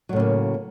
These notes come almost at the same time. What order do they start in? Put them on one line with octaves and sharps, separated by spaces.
F#3 A2 C#3 A#3